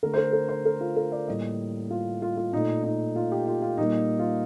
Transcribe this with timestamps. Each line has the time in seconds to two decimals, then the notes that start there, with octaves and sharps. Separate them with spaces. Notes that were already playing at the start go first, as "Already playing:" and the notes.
0.03 D3 A3 A#4
0.14 C5
0.17 A#4
0.33 A#4
0.49 C5
0.66 A#4
0.81 F4
0.96 A#4
1.12 D5
1.28 A2 G3 A#3 D#5
1.90 F4
2.22 F4
2.37 F4
2.53 A#2 A3 D#4
2.84 D#4
3.16 F4
3.32 G4
3.47 F4
3.62 F4
3.77 A#2 G3 A#3 D#4
4.19 F4